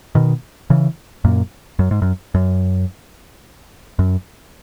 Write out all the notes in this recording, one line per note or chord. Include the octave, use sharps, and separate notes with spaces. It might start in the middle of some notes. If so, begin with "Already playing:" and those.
B2 D#3
C#3 E3
F#2 A#2
F#2
G#2
F#2
F#2
F#2